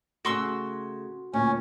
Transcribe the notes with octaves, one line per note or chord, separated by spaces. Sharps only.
C#3 A3 F#4 C6 E6
D2 A#2 C#4